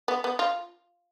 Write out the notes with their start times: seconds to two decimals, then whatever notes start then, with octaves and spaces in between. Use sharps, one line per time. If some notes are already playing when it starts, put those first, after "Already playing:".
0.08 B3
0.24 B3
0.39 F4